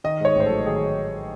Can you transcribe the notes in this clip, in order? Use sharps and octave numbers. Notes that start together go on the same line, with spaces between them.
D#3 D#5
G#2 C#5
A1 C5
A4
F#3
D#3 G#4